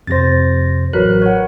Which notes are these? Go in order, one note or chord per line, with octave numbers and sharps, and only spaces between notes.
F2 C3 C5 A6 A#6
A1 F#3 A#4 B4 F#6
C#5 F#5